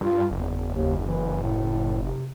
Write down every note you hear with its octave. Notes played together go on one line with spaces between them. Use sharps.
G2 F4
F#1 E2
D#2
E3
A2
C3